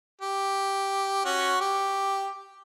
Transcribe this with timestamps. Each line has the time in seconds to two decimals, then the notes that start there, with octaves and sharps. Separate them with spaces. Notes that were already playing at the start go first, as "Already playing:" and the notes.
0.21 G4
1.25 C#4 F#4
1.61 G4